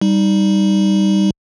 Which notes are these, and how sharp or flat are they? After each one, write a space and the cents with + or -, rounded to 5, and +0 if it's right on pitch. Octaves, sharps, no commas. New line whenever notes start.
G3 +0 D#4 +0